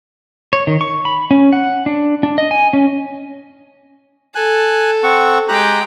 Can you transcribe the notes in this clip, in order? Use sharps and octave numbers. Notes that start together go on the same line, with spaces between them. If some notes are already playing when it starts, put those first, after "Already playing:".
C#5
D#3
C#6
B5
C#4
F#5
D4
D4
D#5
G#5
C#4
A4 G#5 F#6
C4 F#5 C#6
G#3 G4 G5 A#5 F#6